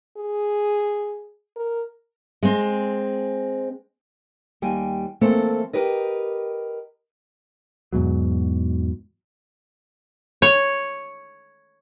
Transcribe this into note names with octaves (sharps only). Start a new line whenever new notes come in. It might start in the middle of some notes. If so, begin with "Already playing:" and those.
G#4
A#4
G#3 C4
D#2 G3 G5 G#5
E3 A3 A#3 C4 A4 C5
G4 A#4 B4 D#5
E2 G#2 B2 F#3
C#5